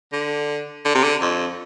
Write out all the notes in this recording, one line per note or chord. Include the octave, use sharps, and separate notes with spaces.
D3
D3
C3
D3
F2